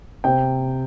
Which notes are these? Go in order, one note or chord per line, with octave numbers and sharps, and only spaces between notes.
C3 G5